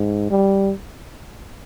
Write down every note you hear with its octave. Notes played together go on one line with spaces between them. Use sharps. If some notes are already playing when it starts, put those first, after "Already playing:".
Already playing: G#2
G3